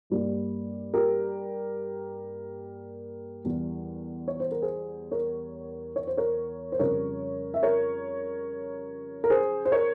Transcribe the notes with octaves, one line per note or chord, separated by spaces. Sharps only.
G2 G3 A#3
G4 A#4
E2 E3 G3
C#5
C5
A#4
G#4 C5
A#4 C#5
C#5
C5
A#4 C#5
C5
F2 C#3 G3 A#4 C#5
E5
A#4 C#5
A#4
G#4 C5
C5
A#4 C#5